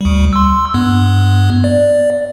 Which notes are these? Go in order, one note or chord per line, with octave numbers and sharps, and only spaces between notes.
D2 G3
C6 E6
G2 B3
D5